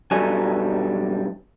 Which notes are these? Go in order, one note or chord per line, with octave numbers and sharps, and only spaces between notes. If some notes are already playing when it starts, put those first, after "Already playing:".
B1 G2 F#3 G3 A4 G#5